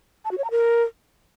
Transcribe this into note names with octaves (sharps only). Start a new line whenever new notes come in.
A5
F#4
C#5
A#5
A#4